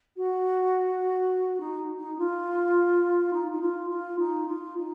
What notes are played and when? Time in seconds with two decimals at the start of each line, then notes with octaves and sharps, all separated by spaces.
0.17 F#4
1.60 D#4
1.98 D#4
2.19 F4
3.33 D#4
3.52 D#4
3.61 F4
3.90 F4
4.19 D#4
4.48 F4
4.77 D#4